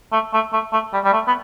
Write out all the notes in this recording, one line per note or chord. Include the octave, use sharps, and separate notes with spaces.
A3
A3
A3
A3
G3
G3
A3
B3